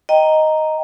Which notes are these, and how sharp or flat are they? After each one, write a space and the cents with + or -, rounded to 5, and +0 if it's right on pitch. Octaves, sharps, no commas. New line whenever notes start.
D#5 +5 G5 +0 A#5 +0